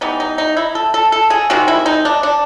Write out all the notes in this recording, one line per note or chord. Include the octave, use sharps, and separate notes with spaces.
E3 G3 B3 D#4
D#4
D#4
E4
A4
A4
A4
G#4
C3 D#3 G#3 C4 F#4
E4
D#4
D4
D4